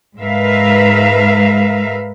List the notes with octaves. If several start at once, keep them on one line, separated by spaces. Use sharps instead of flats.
G#2 G#3 A#4 B4 E5 F5